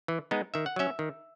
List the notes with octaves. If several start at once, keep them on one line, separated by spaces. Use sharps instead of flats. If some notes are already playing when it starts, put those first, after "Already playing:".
E3
G#3 B3 D#4
D#3 E5
F#5
F#3 C#4 E5
D#3